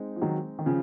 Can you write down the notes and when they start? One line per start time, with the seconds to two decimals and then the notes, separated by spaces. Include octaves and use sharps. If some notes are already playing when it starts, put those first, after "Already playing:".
Already playing: G#3 C4 D#4
0.16 F3
0.22 D#3 F#3
0.59 D#3
0.66 C#3 F3